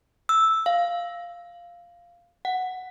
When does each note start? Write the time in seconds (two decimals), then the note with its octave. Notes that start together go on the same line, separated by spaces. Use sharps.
0.29 E6
0.66 F5
2.45 F#5